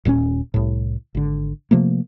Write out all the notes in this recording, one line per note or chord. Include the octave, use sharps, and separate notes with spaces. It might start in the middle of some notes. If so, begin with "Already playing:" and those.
D#1 A#2 A#3 C#4
C2 A2
G#1 D3
C3 F3 A3 A#3